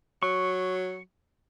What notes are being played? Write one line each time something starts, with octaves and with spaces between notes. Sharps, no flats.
F#3 C#6